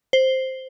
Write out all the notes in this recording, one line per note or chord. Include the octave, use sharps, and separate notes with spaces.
C5